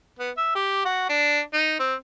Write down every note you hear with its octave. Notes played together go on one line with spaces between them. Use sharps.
B3
E5
G4
F#4
D4
D#4
C4